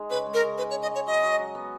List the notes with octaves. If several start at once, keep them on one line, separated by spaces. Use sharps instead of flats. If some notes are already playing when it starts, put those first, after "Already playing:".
Already playing: G#3 D#4
C#3 B4
G#3
A#4
C#3
D#4 B4
C#5
C#3
D#5
G#3 C#5
F#3 D#5
F#4
F#3
B3